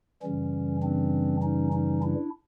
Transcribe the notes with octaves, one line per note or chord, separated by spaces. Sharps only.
F#2 C#3 E3 G3 C#4
C4 D4
C#4 D#4
C#4 D#4
D4 E4